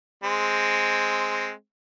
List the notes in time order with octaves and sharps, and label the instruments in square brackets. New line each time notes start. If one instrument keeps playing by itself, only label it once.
[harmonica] G#3 C4